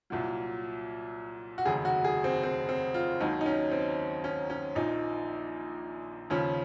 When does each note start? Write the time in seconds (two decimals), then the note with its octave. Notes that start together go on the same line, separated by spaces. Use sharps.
0.10 C2 A#2 F#3
1.58 F#4
1.65 F1 D#2 C#3 F#3 G#4
1.85 F#4
2.05 G#4
2.24 C4
2.43 C4
2.69 C4
2.94 F4
3.20 D#2 D#3 F#3 D#4
3.41 D#4
3.46 C#4
3.72 C4
4.24 C#4
4.50 C#4
4.76 A#1 A#2 F3 D#4
6.30 D#2 C#3 F3 C#4